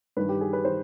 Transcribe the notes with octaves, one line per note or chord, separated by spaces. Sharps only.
G2 D#3 B4
G4
G#4
B4
D#3 C5